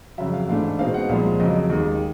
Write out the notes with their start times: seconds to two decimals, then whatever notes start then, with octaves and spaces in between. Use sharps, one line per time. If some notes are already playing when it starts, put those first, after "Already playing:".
0.18 F2 C#3 F#3 E5
0.34 F5
0.48 G#2 E3 A3 D4 F5
0.79 B2 G#3 C4 D#4 F5
0.94 F#5
1.09 C2 A#2 F3 G#3 F5
1.40 F2 C#3 F#3 D#5
1.70 D#2 D#3 G#3